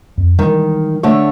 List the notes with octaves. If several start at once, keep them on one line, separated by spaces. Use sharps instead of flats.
F2
D#3 E3 G3 G#3
D3 A3 C#5